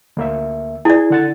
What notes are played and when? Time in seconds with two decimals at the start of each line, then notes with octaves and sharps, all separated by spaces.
0.17 D2 A#3 E5
0.85 E4 G#4 D5
1.10 D3 F#5 A6